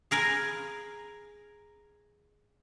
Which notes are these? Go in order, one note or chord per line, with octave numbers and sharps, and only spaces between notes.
G#4 A#4 B4 G#5